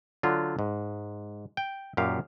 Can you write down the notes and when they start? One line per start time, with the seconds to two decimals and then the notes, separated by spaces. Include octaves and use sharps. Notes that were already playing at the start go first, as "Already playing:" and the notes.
0.23 D3 F#3 F4
0.59 G#2
1.57 G5
1.97 F#2 A#2 G4 F5